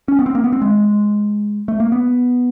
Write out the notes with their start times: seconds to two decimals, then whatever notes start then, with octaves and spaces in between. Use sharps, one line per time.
0.08 C#4
0.19 B3
0.26 C4
0.35 A#3
0.44 B3
0.53 C4
0.62 G#3
1.68 A3
1.80 A#3
1.92 B3